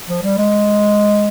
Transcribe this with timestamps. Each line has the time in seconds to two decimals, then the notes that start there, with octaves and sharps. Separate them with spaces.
0.08 F3
0.23 G3
0.38 G#3